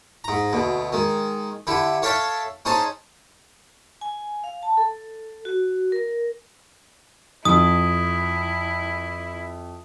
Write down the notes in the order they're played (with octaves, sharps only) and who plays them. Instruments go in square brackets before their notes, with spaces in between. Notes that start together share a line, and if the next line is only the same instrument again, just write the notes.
[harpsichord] G#2 A#5
D2 B2
D#3 G#3
D3 E4 G4
A4 C#5 E5 F5 G5 A5
C#4 D#4 G#4 C5 A5
[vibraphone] G#5
F5
A5
A4
F#4
A#4
[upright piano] F2 [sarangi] E4 [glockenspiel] D#6